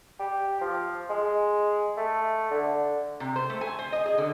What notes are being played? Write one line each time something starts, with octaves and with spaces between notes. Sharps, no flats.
G4
F3
G#3
A3
D3
C3
C5
A3
G#5
C5
D#5
G#4
D3